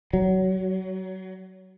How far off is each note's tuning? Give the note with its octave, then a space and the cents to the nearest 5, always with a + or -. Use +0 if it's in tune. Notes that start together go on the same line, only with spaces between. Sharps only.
F#3 +25